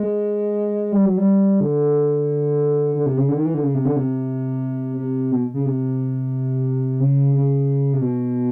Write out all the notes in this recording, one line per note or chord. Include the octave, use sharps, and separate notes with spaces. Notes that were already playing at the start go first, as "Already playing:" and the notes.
Already playing: G#3
G3
F#3
G3
D3
D3
C3
C#3
D3
D#3
E3
D3
C#3
C3
D3
C3
C3
B2
C#3
C3
C#3
C#3
C3
B2